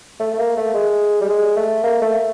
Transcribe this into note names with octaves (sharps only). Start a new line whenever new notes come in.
A3
A3
A#3
A3
G#3
G3
G#3
A3
A#3
A3